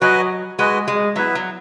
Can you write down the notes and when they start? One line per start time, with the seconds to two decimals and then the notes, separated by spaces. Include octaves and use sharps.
0.01 F#3 F#4 B4 D#5 G#5
0.59 G#3 F#4 B4 D#5 G#5
0.88 G#3
1.16 F#3 B3 E4 B4 E5
1.35 F#3